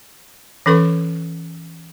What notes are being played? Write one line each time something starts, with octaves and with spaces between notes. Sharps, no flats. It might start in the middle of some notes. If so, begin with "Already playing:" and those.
E3 C#4 A4 B4 C#6